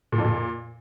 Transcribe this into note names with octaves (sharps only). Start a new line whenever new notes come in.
A#2
F2
A#2